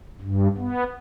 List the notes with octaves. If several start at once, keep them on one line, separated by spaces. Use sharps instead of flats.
G2
B3